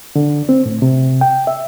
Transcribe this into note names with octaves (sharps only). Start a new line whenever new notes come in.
D3
C4
A2
C3
G5
E5